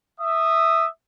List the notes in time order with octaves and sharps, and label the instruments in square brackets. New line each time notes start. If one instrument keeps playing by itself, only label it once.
[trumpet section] E5 D#6